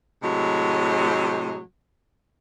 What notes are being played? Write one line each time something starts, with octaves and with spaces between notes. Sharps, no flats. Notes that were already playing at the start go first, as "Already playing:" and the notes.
A2 C3 F#3 G#3